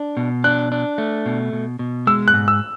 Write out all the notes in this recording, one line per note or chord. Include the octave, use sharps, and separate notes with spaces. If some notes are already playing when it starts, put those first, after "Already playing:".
Already playing: D4
B2
D4 F#6
D4
A3
B2
B2
B2
G#3 E6
F#6
G#2
E6